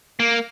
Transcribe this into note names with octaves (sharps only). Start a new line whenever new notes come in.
A#3